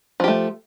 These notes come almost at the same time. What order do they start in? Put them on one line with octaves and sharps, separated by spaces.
F3 G4 A3